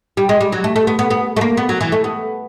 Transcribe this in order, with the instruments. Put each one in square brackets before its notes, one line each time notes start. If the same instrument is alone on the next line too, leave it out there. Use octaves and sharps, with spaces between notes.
[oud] G3
G#3
G3
F#3
A3
A3
B3
B3
B3
A3
A#3
B3
F#3
E3
A3
B3